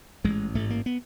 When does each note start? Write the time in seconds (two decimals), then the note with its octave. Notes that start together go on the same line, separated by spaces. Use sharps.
0.24 A1 G#2 G#3
0.55 A1 G#2 A3
0.70 A#3
0.86 B3